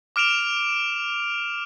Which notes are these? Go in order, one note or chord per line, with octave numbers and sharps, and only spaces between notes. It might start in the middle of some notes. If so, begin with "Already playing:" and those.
D6 F6 D7 E7 F7